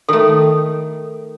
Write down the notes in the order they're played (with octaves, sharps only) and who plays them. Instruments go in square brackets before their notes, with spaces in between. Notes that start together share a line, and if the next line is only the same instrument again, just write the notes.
[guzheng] D#3 A3 [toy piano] A4